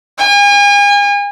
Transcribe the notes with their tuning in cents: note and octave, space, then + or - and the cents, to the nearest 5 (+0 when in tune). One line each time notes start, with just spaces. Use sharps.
G#5 -40